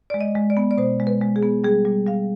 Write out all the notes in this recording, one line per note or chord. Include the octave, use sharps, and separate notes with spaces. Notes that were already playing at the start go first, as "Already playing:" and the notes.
G#3 D5
D#5
G#3
D5
B3
D5
B2 C5
G#3
B4
G#3
G#4
B3
G3 G#4
G3
G3 F5